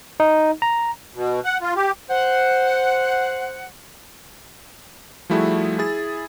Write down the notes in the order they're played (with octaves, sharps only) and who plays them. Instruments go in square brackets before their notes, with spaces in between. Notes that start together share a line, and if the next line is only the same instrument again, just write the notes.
[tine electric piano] D#4
A#5
[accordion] B2
F#5
F4
G4
[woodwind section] C5 F#5
[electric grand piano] F3 G3 A3 E4 F#4 G#4
E4 G#4 A6